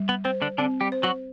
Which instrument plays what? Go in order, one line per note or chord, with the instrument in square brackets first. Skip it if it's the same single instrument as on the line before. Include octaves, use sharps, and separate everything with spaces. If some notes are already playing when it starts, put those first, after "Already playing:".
Already playing: [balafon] G3
[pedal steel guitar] B3
[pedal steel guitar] C4 [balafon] C5
[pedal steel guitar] D3 D4
[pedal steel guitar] D3 D4 [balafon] C4
[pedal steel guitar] G3 G4
[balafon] C5
[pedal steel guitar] F#3 F#4